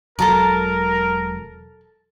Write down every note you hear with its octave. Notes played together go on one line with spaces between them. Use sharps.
E1 F#3 A4 A#4 A5 A#5